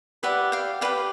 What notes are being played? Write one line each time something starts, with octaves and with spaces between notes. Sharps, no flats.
G4 B4 D5 E5 F#5
F5 G5
G4 B4 D5 F5 G5